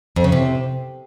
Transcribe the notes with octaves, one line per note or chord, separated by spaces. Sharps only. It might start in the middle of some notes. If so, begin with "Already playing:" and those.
F2
C#3
C3